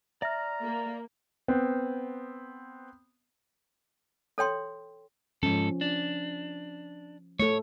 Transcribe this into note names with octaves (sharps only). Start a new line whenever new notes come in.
D5 E5 A#5 F6
A#3
B3 C4
A4 C#5 G5 C6
G#2 F3 C#4 A4
D4
A3 A4 C#5